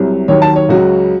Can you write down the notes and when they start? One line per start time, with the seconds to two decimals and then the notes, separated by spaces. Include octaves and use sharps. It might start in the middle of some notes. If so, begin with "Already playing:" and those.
Already playing: C2 C3 F#3
0.28 D#2 D#3 F#3 C#5
0.42 A5
0.56 C#5
0.69 C#2 C#3 F#3 F#4